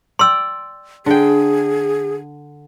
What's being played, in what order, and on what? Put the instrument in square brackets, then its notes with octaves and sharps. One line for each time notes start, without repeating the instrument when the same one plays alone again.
[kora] D5 G5 [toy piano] C6 E6
[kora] D3 G5 [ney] G#4